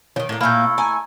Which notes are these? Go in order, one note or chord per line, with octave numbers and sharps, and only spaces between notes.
D#3 F3 C#5
A2 A#3
A#2 A3 A#3 E4 A4 B5 F6 G6
G#5 A#5